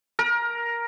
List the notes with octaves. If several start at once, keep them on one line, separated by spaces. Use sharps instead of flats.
A#4